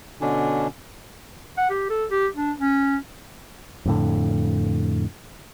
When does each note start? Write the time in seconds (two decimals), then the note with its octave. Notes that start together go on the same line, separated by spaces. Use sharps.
0.21 B2 D3 C#4 D4
1.57 F#5
1.70 G4
1.90 A4
2.11 G4
2.36 D4
2.58 C#4
3.86 F2 A2 D3